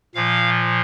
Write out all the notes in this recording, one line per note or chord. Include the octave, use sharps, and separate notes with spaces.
A#2 F3 F5